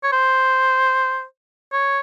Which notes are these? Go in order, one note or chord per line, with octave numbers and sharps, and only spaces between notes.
C#5
C5
C#5